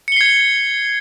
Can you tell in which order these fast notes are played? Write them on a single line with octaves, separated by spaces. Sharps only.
C#7 G7 C7 G#6